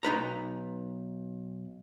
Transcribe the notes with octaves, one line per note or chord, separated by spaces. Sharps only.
B1 D#4 B4 A#5